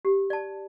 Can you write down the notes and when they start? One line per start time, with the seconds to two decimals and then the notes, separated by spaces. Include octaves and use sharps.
0.05 G4
0.30 D5 A5